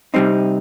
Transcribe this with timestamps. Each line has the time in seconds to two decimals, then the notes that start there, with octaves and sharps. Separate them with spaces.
0.14 C3 G3 C4 D#4